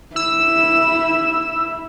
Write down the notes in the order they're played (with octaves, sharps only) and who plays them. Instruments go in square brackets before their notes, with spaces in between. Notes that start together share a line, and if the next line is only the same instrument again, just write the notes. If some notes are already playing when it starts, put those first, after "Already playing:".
[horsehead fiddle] E4 [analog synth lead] E6